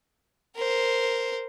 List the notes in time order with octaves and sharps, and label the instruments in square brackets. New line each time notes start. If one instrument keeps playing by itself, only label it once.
[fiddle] A#4 C5